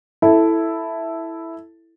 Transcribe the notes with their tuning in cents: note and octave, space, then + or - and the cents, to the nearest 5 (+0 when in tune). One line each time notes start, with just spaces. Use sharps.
E4 +0 A4 +0